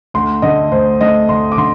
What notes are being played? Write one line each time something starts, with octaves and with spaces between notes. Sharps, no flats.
D2 C6
D3 A3 D#5
D2 C5
D3 A3 D#5
D2 C6
D6
D3 C6